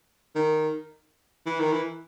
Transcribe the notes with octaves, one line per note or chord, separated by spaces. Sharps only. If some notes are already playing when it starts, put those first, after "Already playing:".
D#3
E3
D#3
E3